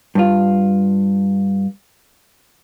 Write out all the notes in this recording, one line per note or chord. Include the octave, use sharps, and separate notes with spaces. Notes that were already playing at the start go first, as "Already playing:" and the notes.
G2 F4